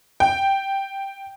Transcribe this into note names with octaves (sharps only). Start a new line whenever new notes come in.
G5